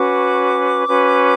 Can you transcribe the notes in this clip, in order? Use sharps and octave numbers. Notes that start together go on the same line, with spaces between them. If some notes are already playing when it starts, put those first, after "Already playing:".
Already playing: C#4 F#4 B4 D6
C#4 F#4 B4